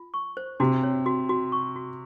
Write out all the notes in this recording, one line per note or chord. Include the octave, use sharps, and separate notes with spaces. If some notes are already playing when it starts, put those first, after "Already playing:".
Already playing: F4
C#6
C5
C3 F#4
C#5
F#4
F#4
C#6
F#4